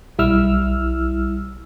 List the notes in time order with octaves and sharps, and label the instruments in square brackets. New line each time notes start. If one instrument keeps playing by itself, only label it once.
[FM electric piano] B1 G3 E4 E6 F6